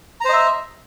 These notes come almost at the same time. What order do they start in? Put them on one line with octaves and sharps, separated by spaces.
A#5 C5 D#5 E5